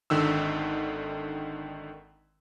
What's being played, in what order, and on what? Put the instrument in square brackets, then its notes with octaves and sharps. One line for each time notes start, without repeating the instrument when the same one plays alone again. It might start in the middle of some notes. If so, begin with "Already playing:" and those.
[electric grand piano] G#1 D3 D#3 E6